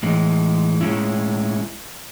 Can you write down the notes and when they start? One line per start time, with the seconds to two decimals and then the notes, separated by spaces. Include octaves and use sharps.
0.03 A2 E3 G#3
0.81 A2 G#3 C#4 E4